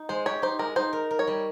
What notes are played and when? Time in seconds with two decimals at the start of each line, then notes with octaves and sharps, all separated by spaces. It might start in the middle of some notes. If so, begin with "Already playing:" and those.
Already playing: D#4
0.09 G#3 C5
0.26 G4 C#5
0.42 D#4 C5
0.59 G#3 A#4
0.76 D#4 C5
0.93 A#4
1.11 A#4
1.19 C#5
1.27 G3